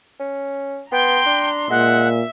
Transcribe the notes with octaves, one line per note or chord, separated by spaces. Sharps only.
C#4
B3 G5 A#5 C6
D4
A#2 G#3 E5 F#5